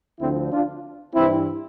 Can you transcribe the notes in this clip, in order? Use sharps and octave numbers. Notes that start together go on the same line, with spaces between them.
D2 D3 F3 C4 E4
D4 F4
G2 E3 C4 E4